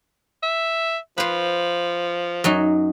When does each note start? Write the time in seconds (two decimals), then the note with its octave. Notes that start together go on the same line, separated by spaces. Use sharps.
0.43 E5
1.18 F3 B4 C5
2.44 F#2 F#3 D#4